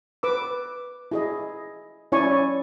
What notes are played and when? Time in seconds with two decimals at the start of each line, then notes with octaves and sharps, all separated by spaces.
0.23 B4 D6 E6
1.11 E4 G#4 D#5
2.12 C#4 E4 C#5 D5 G#5 C#6